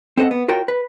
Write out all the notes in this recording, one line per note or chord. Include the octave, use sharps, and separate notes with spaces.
C4 A4 C5 D#5 F#5
B3
F4 F#4 A#4 C#5 G5
B4